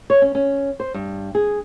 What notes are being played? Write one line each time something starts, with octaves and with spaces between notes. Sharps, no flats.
C#5
C#4
C#4
C5
G2
G#4